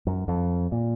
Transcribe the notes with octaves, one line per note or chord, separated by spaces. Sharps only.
F#2
F2
A#2